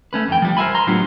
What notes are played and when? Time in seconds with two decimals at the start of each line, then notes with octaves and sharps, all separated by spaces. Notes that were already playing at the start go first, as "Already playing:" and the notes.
0.13 A3 C#4 B4
0.28 F2 E3 G5
0.42 F3 G3
0.57 A#4 C5 C#5 E5 G#5 B5
0.75 A#5 C6
0.87 A2 F#3 B3 D4 F4 G4